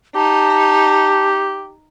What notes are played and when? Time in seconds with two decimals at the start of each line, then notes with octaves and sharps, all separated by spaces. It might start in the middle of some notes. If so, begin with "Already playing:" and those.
0.15 D#4 G4 A5